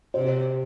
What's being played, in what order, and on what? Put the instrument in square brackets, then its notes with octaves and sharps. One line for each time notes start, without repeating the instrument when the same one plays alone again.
[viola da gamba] C3 [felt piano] C5